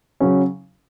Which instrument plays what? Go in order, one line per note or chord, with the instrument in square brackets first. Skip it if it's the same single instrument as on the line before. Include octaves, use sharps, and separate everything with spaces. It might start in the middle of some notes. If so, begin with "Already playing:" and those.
[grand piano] C#3 F#3 C#4